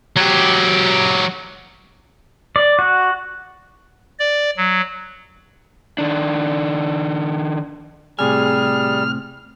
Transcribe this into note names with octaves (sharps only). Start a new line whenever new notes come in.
F#3 G4
D5
F#4
D5
F#3
D#3 D4
A2 C3 G3 G#4 G#5 F6